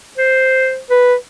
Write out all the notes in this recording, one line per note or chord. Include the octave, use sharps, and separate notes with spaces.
C5
B4